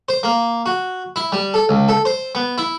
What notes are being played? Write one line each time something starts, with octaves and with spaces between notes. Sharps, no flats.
C5
A#3
F#4
E4
G3
A4
C#2
A4
C5
B3
E4